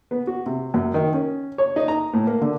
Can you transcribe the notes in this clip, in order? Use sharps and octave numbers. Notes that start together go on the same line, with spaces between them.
B3
F#4
C3
F#2
D#3
C#4
C#5
D#4
A#5
A2
A#3
D3